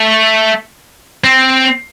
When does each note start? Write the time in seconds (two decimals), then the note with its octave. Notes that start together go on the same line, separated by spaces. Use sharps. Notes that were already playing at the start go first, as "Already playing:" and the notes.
Already playing: A3
1.24 C4